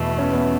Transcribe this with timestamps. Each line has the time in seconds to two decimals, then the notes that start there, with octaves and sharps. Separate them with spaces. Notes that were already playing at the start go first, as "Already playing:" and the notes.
Already playing: E2 B2 A3
0.18 C#4
0.32 B3